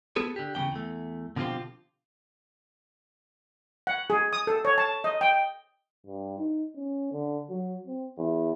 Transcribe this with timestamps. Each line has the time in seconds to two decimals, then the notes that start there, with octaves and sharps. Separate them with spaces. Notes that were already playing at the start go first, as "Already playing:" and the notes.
0.16 B3 G#4 A4 B4
0.36 D3 G4
0.55 E2 C#3 G#3 A#3 G5
0.72 E2 A3
1.36 B2 D3 F3 C4 F4 G4
3.87 F#5
4.10 G#4
4.33 D#6
4.47 A4
4.65 C#5
4.78 A5
5.04 D#5
5.21 G5
6.07 G2
6.39 D#4
6.76 C#4
7.12 D3
7.50 F#3
7.87 C4
8.17 E2